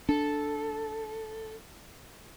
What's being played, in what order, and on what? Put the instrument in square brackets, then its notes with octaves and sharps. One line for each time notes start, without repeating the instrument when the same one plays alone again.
[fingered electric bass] D4 [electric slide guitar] A4